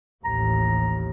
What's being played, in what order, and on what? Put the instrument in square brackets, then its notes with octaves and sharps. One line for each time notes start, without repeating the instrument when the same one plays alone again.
[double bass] A1 D#2 [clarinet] A#5